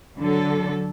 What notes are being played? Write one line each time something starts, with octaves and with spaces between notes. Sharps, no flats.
D3 F#3 A4